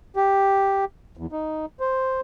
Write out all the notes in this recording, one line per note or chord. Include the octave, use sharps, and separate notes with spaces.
G4
E2
D#4
C5